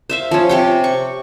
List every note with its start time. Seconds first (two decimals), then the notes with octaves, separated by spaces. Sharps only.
0.10 C5 E5 F5
0.31 F3 C#4
0.49 C3 G4 G5
0.84 C#6